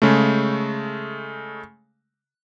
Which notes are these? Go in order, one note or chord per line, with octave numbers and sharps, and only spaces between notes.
C#3 G#3 A3